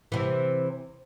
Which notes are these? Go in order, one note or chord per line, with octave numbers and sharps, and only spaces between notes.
C3 E3